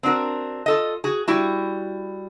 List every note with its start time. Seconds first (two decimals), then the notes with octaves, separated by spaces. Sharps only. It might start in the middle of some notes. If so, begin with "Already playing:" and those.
0.03 C4 D4 F#4 A#4
0.66 F4 A4 D#5
1.04 F#4 G#4
1.28 G3 E4 F#4